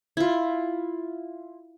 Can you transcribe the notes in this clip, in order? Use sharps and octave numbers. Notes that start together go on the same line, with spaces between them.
E4 F4